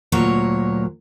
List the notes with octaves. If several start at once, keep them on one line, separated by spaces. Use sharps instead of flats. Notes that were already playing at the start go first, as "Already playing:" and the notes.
D2 A#2 F#3 A#3 C#5 A#5